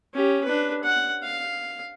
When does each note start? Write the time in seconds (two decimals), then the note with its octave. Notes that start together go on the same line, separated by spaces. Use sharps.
0.14 C#4 G4
0.44 D4 B4
0.83 F#5
1.23 F5